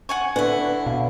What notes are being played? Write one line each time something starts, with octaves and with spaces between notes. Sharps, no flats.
F#5 G#5 C#6
D3 E4 B4 F#5
B2 F5